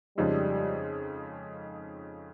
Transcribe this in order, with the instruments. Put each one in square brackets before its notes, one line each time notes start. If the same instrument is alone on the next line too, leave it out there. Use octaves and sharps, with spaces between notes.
[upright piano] F2 C#3 F3 G#3 D#4 [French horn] G3